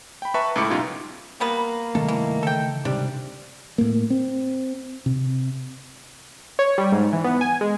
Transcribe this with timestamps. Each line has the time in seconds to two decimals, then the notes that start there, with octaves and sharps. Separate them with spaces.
0.22 G5 B5
0.34 B4 E5 A5 A#5 C#6
0.56 C#2 A2 B5 D6 C#7
0.70 F#2 B2 D#4 F4 G4 G#6
1.40 G3 A#3 B3 B4
1.95 G2 C3 D#3 A3 A4
2.08 E3
2.43 C#3 E3 A4 G5
2.85 C#2 G#2 C3 G3 D4
3.78 A2 A#3
4.10 C4
5.06 C3
6.59 C#5
6.78 G3
6.92 G#2
7.13 E3
7.24 B3
7.41 G#5
7.61 G#3